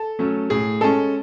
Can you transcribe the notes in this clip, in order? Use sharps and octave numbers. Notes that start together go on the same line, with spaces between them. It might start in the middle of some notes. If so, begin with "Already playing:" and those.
Already playing: A4
F#3 A3 C#4
A2 G#4
G#3 C#4 A4